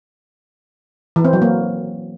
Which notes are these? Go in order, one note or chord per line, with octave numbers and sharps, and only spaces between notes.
E3
C4
F#3
A#3